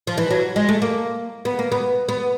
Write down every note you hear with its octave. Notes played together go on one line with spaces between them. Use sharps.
F3
E3
F#3
G#3
A3
A#3
B3
A#3
B3
B3